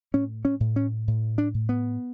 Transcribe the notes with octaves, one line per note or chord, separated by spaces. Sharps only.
A2 C#4
C#4
A2
C#4
A2
D4
A2
B3